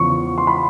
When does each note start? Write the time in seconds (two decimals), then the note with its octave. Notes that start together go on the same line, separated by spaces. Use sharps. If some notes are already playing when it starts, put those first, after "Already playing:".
Already playing: E2 C#3 F3 C#6
0.38 C6
0.47 B5